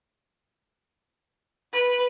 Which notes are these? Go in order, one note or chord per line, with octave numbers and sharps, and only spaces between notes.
B4